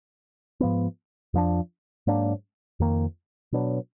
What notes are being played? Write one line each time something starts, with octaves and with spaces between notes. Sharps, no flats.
G#2 F3 B3
F2 F3 B3 D4
G#2 F#3 A#3 D4
F2 D#3 A#3
B2 F#3 B3 D4